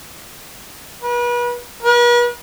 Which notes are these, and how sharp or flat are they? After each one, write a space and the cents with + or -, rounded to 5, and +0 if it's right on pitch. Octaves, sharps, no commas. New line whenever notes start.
B4 -35
B4 -45